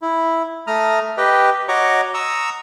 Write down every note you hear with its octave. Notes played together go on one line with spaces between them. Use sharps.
E4
A3 A#5 D#6 F6
G4 B4 D#5 G5
F#4 C#5 D#5 A#5 C#6 D6
A#5 C#6 D#6 E6